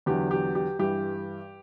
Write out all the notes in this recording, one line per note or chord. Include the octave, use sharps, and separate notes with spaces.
E2 D3 F#3 G4
G4
G4
G2 E3 G4